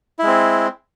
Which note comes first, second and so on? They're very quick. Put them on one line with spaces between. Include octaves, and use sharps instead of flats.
E4 G#3 C4